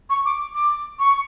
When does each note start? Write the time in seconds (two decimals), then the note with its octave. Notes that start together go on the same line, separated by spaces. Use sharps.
0.09 C#6
0.25 D6
0.54 D6
0.99 C#6